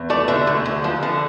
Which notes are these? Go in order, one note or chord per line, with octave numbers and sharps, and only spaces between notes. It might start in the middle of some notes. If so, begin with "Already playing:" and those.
Already playing: E2
A3 D5
D3 E5
D2
D2
F3
D3